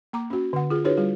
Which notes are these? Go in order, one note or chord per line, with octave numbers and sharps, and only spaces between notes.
A#3 A#5 D6
C#4 F#4
D3 F#5
F4 G#4
D4 E4 F#4 G#4 B4 C#5
G3 F4 G#4